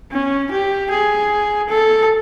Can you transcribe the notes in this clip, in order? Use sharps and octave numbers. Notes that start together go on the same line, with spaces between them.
C#4
G4
G#4
A4